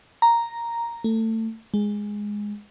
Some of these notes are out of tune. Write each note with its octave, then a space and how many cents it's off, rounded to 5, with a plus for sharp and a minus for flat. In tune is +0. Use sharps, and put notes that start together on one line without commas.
A#5 +0
A3 +25
G#3 -5